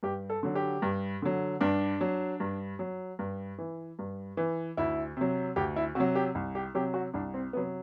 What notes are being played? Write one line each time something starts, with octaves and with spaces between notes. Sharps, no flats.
G2 G4
A4
D3 F#3
G4
G2
D3 F#3
G2 D4
F#3
G2
F#3
G2
E3
G2
E3
D2 E4
C3 F#3
D2 G4
E4
C3 F#3 F#4
G4
C2
G4
C3 F#3 G4
F#4
C2 D4
C4
C3 F#3 B3